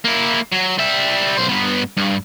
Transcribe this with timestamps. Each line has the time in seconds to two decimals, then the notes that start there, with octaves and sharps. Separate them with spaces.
0.05 A#3 E4
0.52 F#3
0.78 G3 E5
1.37 B1 C5
1.49 G2 B3
1.97 G2